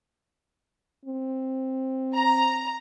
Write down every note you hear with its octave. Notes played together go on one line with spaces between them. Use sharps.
C4
A#5